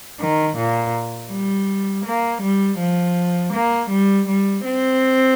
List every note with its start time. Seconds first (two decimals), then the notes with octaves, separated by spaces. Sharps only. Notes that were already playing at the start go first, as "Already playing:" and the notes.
0.19 D#3
0.56 A#2
1.30 G3
2.05 A#3
2.42 G3
2.79 F3
3.53 A#3
3.90 G3
4.28 G3
4.64 C4